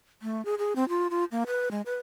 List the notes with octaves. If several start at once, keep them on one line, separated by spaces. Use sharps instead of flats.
A3
G#4
G#4
C4
F4
F4
A#3
B4
G#3
B4